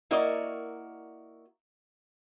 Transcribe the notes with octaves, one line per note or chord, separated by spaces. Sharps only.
A#3 E4 F#4 A#4 D5 D#5